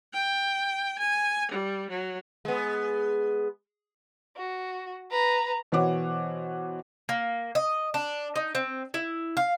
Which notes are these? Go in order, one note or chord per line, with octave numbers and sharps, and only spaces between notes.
G5
G#5
G3
F#3
G#3 B3
F#4
B4 A#5
B2 E3 C5 C#5 F#5 D6
A#3
D#5
D4
D#4
C4
E4
F5